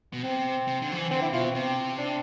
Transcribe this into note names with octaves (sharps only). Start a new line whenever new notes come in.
B2
C3 C4
C3
D3
F3
E3
D3 C4
E4
B2 F4
C4
C3 C4
D4